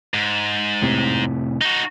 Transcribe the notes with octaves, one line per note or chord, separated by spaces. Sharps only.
G#2
F1 A2 C3
D#4 F#4